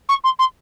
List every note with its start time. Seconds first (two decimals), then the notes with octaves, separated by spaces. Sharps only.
0.09 C#6
0.24 C6
0.39 C6